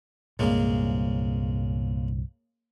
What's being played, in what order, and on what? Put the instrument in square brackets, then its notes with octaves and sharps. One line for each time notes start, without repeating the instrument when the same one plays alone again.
[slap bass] C2 G2 A#2 [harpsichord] C#3 G#3 A#3